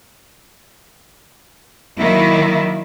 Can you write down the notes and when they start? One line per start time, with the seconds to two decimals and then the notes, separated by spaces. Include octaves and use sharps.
1.99 D#3 F#3 A#3 E4